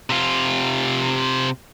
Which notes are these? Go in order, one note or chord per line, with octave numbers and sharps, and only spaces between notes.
C3 F4